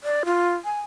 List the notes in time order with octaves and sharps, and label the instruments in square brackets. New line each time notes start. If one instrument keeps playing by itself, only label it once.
[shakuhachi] D5
F4
G#5